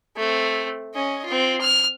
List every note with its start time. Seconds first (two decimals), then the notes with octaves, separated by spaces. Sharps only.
0.17 A3 C4
0.94 C#4 D#5
1.26 C4 F4
1.61 F6